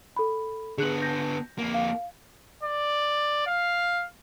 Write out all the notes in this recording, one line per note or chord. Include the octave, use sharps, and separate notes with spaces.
A4 B5
D3 B3 G#4 F#6 F#7
G6 A#6
F2 A#3
F5
D5
F5